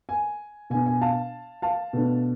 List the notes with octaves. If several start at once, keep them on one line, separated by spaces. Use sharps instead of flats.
G#5
B2 B3 D4 G#5
G#5
F5 A5
F5 A5
B2 A3 D4